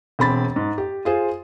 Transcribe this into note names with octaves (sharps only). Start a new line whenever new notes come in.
E1 C4 B5 A6
G#2
G4
F4 G#4 C5